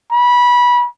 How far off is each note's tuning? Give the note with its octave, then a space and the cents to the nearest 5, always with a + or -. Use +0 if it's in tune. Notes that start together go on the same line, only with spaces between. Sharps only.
B5 -20